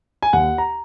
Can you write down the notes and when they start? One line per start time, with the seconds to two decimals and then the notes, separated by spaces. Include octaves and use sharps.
0.22 G#5
0.33 D#2 F#5
0.58 A#5